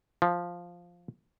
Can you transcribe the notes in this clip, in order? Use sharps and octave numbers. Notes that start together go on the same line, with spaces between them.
F3